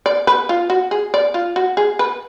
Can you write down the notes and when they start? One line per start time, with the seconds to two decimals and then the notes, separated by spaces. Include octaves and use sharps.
0.06 D5
0.27 B4
0.49 F4
0.70 F#4
0.91 G#4
1.14 D5
1.34 F4
1.56 F#4
1.77 G#4
1.99 B4